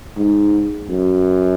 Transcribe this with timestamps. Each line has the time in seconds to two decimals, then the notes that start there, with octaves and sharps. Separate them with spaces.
0.17 G#2
0.89 F#2